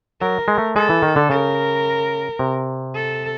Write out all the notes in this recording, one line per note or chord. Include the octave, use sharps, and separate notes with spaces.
F#3 A#4
G#3
A3
G#3 A4
E3
D#3
D3
C#3 A#4
C3
A4